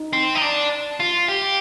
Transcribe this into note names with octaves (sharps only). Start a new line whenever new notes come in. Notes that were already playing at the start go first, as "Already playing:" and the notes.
Already playing: D#4
C4
D#4
D4
F4
G4